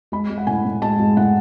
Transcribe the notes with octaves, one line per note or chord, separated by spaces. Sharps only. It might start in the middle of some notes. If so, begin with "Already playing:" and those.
G#3 B5
G#3
F#5
A2 G#5
A2
G#3 A5
G#3
A2 F#5